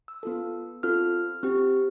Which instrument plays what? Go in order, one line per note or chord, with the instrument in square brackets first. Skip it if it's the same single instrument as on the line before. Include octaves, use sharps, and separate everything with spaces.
[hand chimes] E6
B3 F4 A4
C4 F4 A4 F6
C4 G4